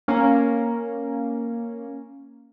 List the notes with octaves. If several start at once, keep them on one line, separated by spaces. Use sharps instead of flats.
A#3 C#4